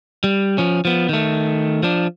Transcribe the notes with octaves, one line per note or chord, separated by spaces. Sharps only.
G3
F3 C#4
F3 B3
D#3 A3
F3 D4